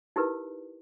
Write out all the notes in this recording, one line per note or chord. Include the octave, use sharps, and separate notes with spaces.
D#4 E4 G4 A#4 B4